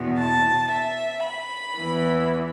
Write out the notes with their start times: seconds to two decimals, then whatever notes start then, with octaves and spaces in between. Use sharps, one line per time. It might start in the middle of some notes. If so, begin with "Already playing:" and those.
Already playing: E2 B2
0.17 A5
0.71 E5
1.24 B5
1.78 E2 E3